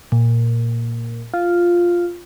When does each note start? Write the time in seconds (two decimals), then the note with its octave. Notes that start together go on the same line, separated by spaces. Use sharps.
0.12 A#2
1.34 F4